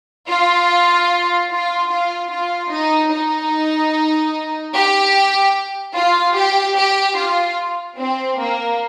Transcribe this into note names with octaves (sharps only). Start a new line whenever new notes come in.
F4
F4
F4
F4
D#4
D#4
G4
F4
G4
G4
F4
C4
A#3